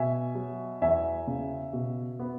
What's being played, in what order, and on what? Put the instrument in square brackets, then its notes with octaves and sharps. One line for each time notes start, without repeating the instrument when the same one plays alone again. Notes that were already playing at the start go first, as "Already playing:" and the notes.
Already playing: [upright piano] B2 E5 G#5
F#3
E2 E5 G#5
C#3
B2
B3